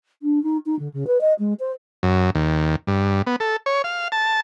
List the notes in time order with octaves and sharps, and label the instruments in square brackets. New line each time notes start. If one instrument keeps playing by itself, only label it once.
[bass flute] D4
D#4
D#4
D3
C#3
B4
D#5
G#3
C5
[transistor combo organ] F#2
D#2
G2
B3
A4
C#5
F5
A5